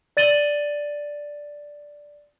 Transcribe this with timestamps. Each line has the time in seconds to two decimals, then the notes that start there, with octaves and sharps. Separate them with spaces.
0.17 D5 A6 D#7 F#7 G7